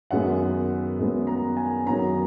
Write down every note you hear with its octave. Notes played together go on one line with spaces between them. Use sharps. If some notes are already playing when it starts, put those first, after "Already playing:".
F#2 D#3 G#3 B3 F#5
F#2 D#3 G#3 B3
A#5
G#5
F#2 D#3 F#3 B3 A#5